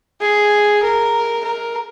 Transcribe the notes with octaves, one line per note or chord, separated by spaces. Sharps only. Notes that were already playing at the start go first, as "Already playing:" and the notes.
G#4
A#4
A#4